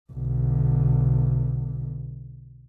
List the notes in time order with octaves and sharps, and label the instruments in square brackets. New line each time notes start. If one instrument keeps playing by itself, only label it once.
[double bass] B1 D3